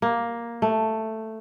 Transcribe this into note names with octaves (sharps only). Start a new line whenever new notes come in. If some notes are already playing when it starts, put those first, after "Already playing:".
A#3
A3